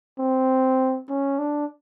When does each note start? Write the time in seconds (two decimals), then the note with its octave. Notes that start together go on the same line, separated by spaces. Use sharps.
0.19 C4
1.09 C#4
1.39 D4